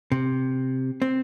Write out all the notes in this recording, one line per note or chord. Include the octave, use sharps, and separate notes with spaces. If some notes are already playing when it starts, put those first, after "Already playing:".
C3
C4